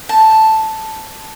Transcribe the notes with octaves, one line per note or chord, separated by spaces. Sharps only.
A5